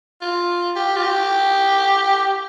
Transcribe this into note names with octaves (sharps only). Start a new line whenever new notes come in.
F4
G4
F4
G4